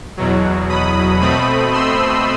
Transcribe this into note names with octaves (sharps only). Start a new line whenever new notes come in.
E2 B2 F#3
B5 D#6
B2 A3 C4 B5 D#6
C6 E6